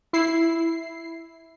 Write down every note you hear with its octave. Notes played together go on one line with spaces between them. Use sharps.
E4 C7